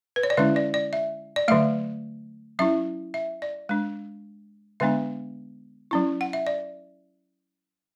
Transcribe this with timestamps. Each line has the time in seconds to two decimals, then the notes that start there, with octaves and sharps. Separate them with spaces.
0.16 B4
0.23 C#5
0.30 D5
0.37 D3 G#3 C#4 E4 E5
0.56 D5
0.74 D5
0.93 E5
1.36 D5
1.48 D3 F#3 A3 E5
2.59 F#3 C#4 E4 E5
3.14 E5
3.42 D5
3.69 G#3 D4
4.80 D3 G#3 B3 D4 E5
5.91 F#3 C#4 E4
6.21 F#5
6.33 E5
6.47 D5